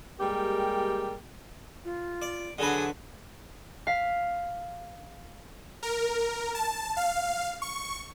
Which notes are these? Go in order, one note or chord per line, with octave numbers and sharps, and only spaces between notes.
G3 G#3 A#3 G4 A#4 G5
F4
D5
D3 F#3 D4 G#4 B4 D#6
F5 B6
A#4
A5
F5
C#6